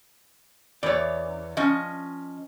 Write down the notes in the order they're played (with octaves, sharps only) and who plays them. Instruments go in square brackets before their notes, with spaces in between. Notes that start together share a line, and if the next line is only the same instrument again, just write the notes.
[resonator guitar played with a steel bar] E2 [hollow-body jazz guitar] C#5 D5
[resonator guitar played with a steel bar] F3 C#4 D#5